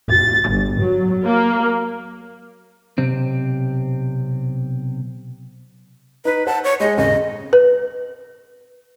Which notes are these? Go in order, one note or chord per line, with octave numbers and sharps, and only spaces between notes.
A6
G1
F#3
A#3
B1 C3 C4
D#4 B4
C5 F#5 A5
C#5
G#3 G#4 D#5
D#1 G#1 C#3 D#5
B4